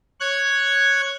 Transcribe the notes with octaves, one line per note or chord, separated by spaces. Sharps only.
C#5 F#6 G#6